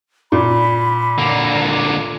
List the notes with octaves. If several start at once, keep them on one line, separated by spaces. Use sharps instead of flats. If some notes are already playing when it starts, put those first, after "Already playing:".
A#2 B5
D3 A#3